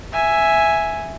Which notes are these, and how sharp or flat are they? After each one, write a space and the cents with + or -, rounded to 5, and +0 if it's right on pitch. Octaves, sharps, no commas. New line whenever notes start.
E5 +0 G#5 +0